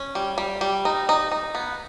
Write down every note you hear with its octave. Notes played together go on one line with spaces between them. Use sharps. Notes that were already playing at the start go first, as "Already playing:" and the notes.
Already playing: C#4
G3
G3
G3
D#4
D#4
D#4
B3